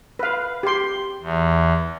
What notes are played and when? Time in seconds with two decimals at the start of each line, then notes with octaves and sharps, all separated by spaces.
0.19 B4 F5
0.63 G4 C6
1.22 E2